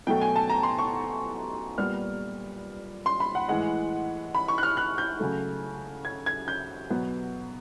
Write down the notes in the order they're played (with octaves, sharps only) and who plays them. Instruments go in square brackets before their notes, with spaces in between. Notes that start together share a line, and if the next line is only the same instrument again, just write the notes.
[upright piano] B2 F#3 A3 G5
G#5
A5
A#5
C6
C#6
A#2 G3 B3 F6
C6
B5
F#5
A2 E3 G#3 F#5
B5
C#6
F#6
F6
F#6
G6
C#3 F#3 A3
G#6
G#6
G6
B2 F#3 B3